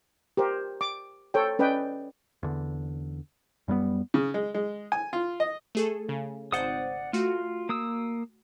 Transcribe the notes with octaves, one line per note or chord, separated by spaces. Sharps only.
G4 A#4 C5
D6
A4 C5 C#5 G5
C#4 B4 D5 D#5 G5
E2 D3
F#2 G3 A3 B3
C#3
G#3
G#3
G#5
F4
D#5
A3 G#4 A4
C#3
G#1 C5 D5 F#5 D#6 G6
A3 F4 F#4
A#3 D#6 E6